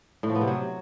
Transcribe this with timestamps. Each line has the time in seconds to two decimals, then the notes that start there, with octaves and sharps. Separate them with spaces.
0.23 A2
0.29 F3
0.35 B3
0.41 C3
0.47 F#3